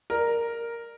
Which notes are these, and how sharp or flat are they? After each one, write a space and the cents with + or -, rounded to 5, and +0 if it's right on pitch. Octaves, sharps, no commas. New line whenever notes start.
A#4 +0 D5 +30